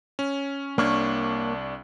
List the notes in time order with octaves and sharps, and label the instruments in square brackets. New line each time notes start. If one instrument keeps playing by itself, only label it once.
[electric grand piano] C#4
[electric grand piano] C2 D4 C#6 [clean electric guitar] A#3 C#5